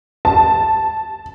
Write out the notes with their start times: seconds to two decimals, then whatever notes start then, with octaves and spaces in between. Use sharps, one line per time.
0.25 A5